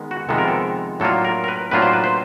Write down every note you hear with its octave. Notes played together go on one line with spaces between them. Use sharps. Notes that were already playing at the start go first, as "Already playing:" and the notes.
Already playing: D#3 G#3 B3
F#4
F2 C3 D#3 G#3 B3 A4
A#4
A4
A2 F#3 A#3 D4 F4 A4
A#4
A#4
B4
A2 F#3 A#3 D4 F4 B4
C5
B4
C5